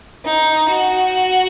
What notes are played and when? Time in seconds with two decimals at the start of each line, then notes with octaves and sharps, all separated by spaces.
0.25 D#4
0.69 F#4